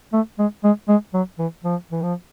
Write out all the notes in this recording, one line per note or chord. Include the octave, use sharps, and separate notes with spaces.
A3
G#3
G#3
G#3
F#3
E3
F3
E3
F3